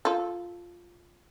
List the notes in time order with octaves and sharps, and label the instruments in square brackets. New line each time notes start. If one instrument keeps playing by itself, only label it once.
[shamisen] F4 A4